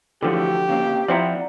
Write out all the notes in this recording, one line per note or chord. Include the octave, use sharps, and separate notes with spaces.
D3 E3 F3 A3 F#4 G4
C#3 A#3 C4
F3 C4 E4 D5 F#5 A#5